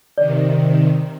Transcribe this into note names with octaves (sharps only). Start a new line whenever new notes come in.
C3 D#3 D5